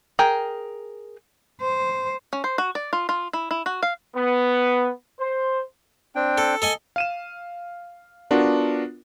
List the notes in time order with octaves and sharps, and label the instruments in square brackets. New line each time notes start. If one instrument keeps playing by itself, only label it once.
[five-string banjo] G#4 A#4 G5
[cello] C5
[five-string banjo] C#4
C5
F#4
D5
F4
F4
E4
E4
F#4
F5
[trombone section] B3
C5
[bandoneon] C4 D4 G5
[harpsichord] A4
A4 D#5 G#5
[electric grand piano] F5 D#7 E7
B3 D4 F4 F#4 A#4